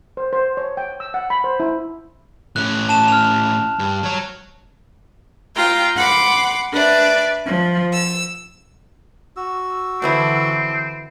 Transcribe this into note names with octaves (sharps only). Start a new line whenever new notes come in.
C5
C5
C#5
G5
E6
F#5
B5
C5
E4
A2 C#4 F#6
A5 E7
F6 F7
G2
F#3 C#5
F4 G5 A#5
F#5 B5 C6 D6
D4 B4 D5 E5
F3
E6
F#4 E6
B2 D3 E3 B3 C4 E4